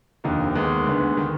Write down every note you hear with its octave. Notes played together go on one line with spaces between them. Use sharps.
F1 D#2 D3 F3 A#3 D#4
D#2 D#3 G#3 B3
D2 D3 G#3 B3
D#3